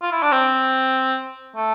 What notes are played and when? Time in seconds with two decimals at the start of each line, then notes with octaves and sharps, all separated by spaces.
0.02 F4
0.12 E4
0.22 D4
0.32 C4
1.56 A3